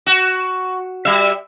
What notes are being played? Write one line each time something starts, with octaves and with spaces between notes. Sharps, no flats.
F#4
G3 E5